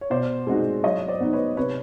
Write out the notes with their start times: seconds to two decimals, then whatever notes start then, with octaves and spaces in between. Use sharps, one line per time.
0.01 C#5
0.10 B2 C5 D5
0.47 G#3 C4 D#4 F#4
0.84 F#3 C#5 D#5
1.08 C5 D5
1.20 B3 D#4
1.33 B4 C#5
1.57 C3 B4 C#5